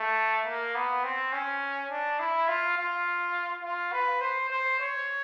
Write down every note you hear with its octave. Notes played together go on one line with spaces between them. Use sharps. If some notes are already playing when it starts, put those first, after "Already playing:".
Already playing: A3
A#3
B3
C4
C#4
D4
E4
F4
F4
F4
B4
C5
C5
C#5